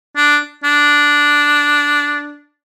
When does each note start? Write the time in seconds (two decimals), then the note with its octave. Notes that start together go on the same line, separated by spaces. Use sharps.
0.16 D4
0.64 D4